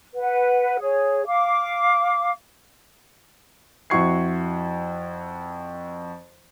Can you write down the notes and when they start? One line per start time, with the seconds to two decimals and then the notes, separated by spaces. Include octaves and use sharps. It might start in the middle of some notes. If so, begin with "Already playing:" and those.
0.15 B4 F#5
0.79 G#4 C#5
1.27 F5 D6
3.90 F2 E4 F#4 C#6 G#6 C7